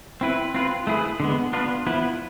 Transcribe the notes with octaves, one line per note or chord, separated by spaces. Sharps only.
C4 E4 B4
C4 F4 B4
A3 E4 G#4 B4
D3 G#3 B3
B3 D4 F4 B4
F3 B3 E4 B4